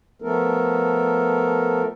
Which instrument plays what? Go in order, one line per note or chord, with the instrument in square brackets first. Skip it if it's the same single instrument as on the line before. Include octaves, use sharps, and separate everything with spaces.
[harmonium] F3 A3 B3 A4 A#4